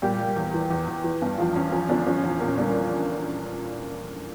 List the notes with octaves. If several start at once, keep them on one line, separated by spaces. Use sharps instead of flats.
A#2 G3 G4
G3
E2
E3
E2
E2
E3
G2
E2 F3 F4
E2 C#4
F3 C#4
D3 F3 D4
F3 C#4
C#4
E2
C#4
A#2 A#3
C#4
D3 G3 D4